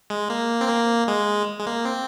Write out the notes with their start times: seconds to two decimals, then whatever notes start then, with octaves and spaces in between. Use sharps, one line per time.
0.10 G#3
0.30 A#3
0.61 C4
0.68 A#3
1.08 G#3
1.59 G#3
1.66 A#3
1.85 C4